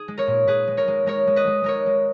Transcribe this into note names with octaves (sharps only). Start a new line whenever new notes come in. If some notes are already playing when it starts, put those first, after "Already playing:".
Already playing: G#4
G#3
A#4 C#5
A#2
A#2 G#4 B4
G#3
A#4 C#5
G#3
G#3 A#4 C#5
G#3
B4 D#5
G#3
G#3 A#4 C#5
G#3